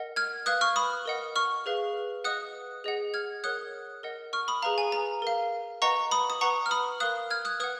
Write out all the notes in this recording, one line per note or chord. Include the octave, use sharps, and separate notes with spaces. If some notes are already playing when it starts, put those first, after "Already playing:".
Already playing: A#4 D#5 F#5
F6 G#6
B4 F5 D#6 F#6
C#6 F6
B5 D#6
A#4 D#5 F#5
C#6 F6
G#4 B4 F5
B4 D#5 F#5 D#6 F#6
G#4 D#5 F#5
F6 G#6
A#4 C#5 F#5 D#6 F#6
A#4 D#5 F#5
C#6 F6
B5 D#6
G#4 B4 F5 A#5
G#5
A#5
A#4 F5
B4 D#5 F#5 A#5 C#6
B5 D#6
D#6
B4 F#5 A#5 C#6
F6
B5 D#6
A#4 F5 D#6 F#6
F6 G#6
D#6 F#6
B4 F#5 D#6 F#6